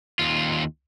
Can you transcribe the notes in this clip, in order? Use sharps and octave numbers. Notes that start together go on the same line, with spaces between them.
D#2 F4